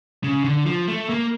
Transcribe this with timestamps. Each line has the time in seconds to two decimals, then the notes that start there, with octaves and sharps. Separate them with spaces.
0.24 C#3
0.44 D3
0.66 F3
0.88 A3
1.10 A#3